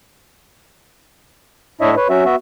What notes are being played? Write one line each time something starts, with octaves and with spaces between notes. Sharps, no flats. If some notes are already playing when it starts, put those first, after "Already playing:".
A2 D4 E4 C#5 D#5 E5
B4 C#5
F#3 C#4 F#4 E5
B3 F#4 E5